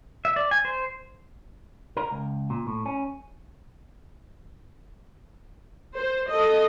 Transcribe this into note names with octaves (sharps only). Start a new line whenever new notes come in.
E5
D5
G#5
C5
A#4
C#2
A#2
A2
C#4
C5
A4 D#5